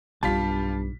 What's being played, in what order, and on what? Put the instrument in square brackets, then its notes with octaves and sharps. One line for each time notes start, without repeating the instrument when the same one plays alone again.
[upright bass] B1 D#4 [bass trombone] G2 [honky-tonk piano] G3 F4 B6 [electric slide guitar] A5